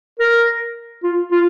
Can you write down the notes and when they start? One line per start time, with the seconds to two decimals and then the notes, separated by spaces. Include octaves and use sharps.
0.19 A#4
1.03 F4
1.31 F4